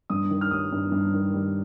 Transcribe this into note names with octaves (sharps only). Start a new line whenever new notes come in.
G2 D#6
D#3
F6
G3 D#6
G2
G2
D#3
G3